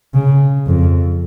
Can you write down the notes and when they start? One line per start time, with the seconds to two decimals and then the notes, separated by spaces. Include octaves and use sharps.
0.14 C#3
0.66 F2